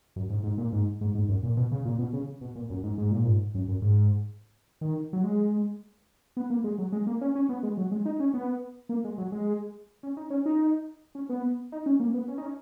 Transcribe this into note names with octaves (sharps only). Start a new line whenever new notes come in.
F#2
G#2
G#2
A#2
G#2
G#2
G#2
F#2
A#2
B2
C#3
A#2
B2
C#3
B2
A#2
F#2
G#2
G#2
A#2
G#2
F#2
F#2
G#2
D#3
F#3
G#3
B3
A#3
G#3
F#3
G#3
A#3
C#4
C#4
B3
G#3
F#3
G#3
D#4
C#4
B3
A#3
G#3
F#3
G#3
C#4
D#4
C#4
D#4
C#4
B3
D#4
C#4
A#3
B3
C#4
D#4
C#4